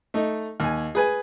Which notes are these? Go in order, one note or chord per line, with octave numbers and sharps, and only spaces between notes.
A3 D#4
D#2 G#5
G#4 B4 G#5